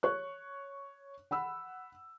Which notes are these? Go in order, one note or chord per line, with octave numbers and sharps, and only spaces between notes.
C#5 C#6 F#6
F#5 B5 E6